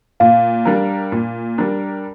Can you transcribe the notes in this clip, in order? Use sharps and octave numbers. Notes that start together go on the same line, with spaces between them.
A#2 F5
G3 D4 A#4
A#2
G3 D4 A#4